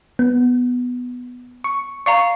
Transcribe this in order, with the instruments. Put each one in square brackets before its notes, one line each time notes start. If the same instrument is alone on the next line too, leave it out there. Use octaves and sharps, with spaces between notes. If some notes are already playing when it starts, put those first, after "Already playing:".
[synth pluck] B3
C#6
[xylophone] D5 F5 A#5 [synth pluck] C#6